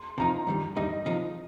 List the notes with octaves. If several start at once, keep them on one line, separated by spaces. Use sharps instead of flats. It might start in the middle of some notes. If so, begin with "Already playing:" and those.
Already playing: C6
C3 F3 D#4 A#5
G2 D#3 G3
G2 G3 D#4 D#5
C2 C3 F3 D#4